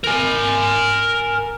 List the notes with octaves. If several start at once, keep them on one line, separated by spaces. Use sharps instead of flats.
A#4 G#5